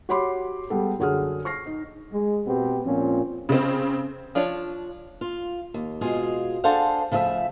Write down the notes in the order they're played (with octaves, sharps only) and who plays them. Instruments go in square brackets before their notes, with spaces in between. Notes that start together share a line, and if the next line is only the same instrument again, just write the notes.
[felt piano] F#4 G4 C#5 B5 C6 D6
G3 G#3 B3 G4 A4
F#2 D3 F#4 G#4 F#5 F6
C#6 F6 A#6 C7
D#4
[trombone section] G#3
B2 B3 C4 G4
A#2 F3 C4 C#4
[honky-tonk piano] C#3 C4
[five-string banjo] F3 D4 F4 C#5
[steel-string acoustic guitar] F4
D#2
B2 G#3 F4 G#4
D4 G#4 A4 C5 F5 F#5
C#3 F3 A3 D#5 E5